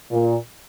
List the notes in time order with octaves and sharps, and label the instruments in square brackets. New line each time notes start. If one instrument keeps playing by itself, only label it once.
[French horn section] A#2